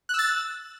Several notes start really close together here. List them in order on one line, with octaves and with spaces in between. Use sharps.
F#6 E6 A6